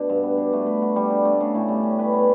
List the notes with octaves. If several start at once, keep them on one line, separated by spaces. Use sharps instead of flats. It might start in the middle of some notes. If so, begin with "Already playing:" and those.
Already playing: B2 D4
G2
B3
D4
A3
B4
F#4
G3
D4
A3
C#3
A2
G3
C#4
B4
B3